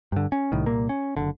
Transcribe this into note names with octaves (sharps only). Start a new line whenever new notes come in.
G2 D3
C#4
C2 A2 D#3
C2 A#2 A#3
C#4
F#1 B1 D3